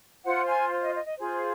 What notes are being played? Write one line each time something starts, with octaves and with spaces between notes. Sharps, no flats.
F4 C5 F#5
G#5
D#5
D#5
D#5
F4 G#4 C5